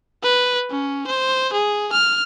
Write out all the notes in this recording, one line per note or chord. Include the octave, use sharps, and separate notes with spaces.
B4
C#4
C5
G#4
F6